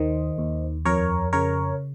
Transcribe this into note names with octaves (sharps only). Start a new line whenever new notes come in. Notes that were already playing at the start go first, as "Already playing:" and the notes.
Already playing: D#2 D#3 C5 D#5
D#2
F2 A#4 C#5
C#3 A#4 C#5